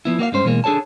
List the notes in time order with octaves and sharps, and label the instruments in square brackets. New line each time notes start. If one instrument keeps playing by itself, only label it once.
[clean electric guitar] F3 B3 E4
A#3 F#4 D5 F5
G2 G#3 C#4 C5
B2 E3 G#3 A#3
D4 G#4 A4 C#5 A5